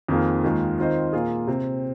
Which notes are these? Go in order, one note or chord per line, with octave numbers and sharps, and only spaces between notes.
F2 D#3 A#3 F4 G#4
D#2 D#3 G#3 F4
D#3 C4 F4 C5 D#5
A#2 A#3 F4 G#4
C3 C4